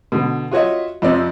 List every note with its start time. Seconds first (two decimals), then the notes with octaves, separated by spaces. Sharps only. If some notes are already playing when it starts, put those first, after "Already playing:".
0.12 B2 D3
0.51 F4 F#4 C#5 D#5 E5
1.02 F2 C3 C4 D5 D#5